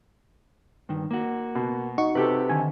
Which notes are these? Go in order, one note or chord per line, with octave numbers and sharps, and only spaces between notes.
G2 D#3
A#3 F#4
B2
D#4 F#4 C#6
C3 G4 A4 B4
D3 D#3 G#5